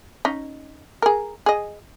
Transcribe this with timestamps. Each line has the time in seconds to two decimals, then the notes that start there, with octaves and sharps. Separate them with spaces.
0.25 C#4 D#4
1.02 G#4 A#4
1.46 G#4 D#5